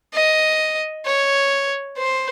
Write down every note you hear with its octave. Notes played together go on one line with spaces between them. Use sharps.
D#5
C#5
C5